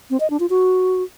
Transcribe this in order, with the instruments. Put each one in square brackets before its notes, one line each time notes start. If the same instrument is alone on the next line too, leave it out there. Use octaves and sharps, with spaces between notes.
[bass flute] C4
D#5
D4
F4
F#4